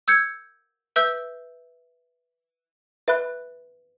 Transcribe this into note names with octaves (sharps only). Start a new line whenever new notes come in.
E6 G6 G#6 C#7
B4 E5 E6 G6
B4 E5 B5 F#6